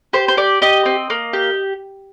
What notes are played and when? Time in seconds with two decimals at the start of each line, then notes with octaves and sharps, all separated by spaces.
0.13 G4 C5
0.28 C5
0.37 G4 D5
0.62 G4 D#5
0.85 C4
1.10 A#3
1.33 G4